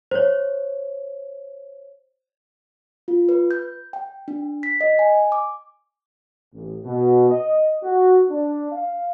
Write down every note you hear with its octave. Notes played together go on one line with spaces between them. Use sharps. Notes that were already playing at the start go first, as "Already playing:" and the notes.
C5 C#5
F4
B4
G6
G5
D4
B6
D#5
G#5
D6
A1
B2
D#5
F#4
D4
F5